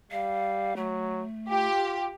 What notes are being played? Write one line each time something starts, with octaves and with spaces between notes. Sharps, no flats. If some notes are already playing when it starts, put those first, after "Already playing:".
G3 F5
F#3 A3
F4 G4